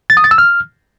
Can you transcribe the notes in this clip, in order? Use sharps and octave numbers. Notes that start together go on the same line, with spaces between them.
A6
D#6
A6
E6
F6